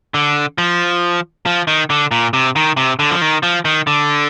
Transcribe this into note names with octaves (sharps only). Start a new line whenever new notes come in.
D3
F3
F3
D#3
D3
A#2
C3
D#3
C3
D3
F3
D#3
F3
D#3
D3